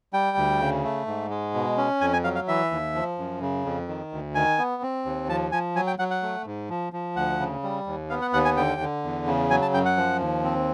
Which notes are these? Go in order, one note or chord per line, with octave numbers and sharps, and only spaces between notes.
G3 G5
D2
C#3
A3
G#2
G#3
B2
C#4
F2 G#5
G#5
F#3 F5
F5
E3 E5
D#2
F3
F#2
C#3
F2
D#3
D2
D#3 G#5
B3
C4
D#2
F3 A5
F3 G#5
F#3 G#5
G5
F#3 F#5
F#5
A3
G#2
F3
F3
D2 F#5
C#3
G3
D#2
B3 F5
F#5
D#2 F#5
G#5
D3 G5
D3
E2
C#3
F#3 G#5
A5
F#2 G5
F#5
F3
D#2
C4